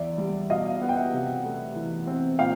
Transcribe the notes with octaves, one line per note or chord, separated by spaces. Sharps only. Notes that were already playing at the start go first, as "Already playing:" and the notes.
Already playing: E2 D5 E5
G3
B2 D#5 F5
B3 F#5
G5
E5 F#5
C3
A3
E3
C4
A#2 F5 G5